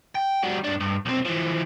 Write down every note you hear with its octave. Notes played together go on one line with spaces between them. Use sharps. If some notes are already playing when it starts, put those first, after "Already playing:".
G5
G3 F#4
G2 D4
G2
B1 C4
E3 F3